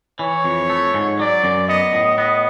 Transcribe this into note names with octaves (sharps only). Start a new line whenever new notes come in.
E3 C#5
F2
A3
G#2
F#3 D5
F#2
B3 D#5
A2
B3 D#5